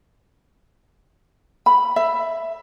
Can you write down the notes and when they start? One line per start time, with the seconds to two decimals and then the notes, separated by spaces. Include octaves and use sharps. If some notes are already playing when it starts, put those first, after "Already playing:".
1.66 B5
1.96 E5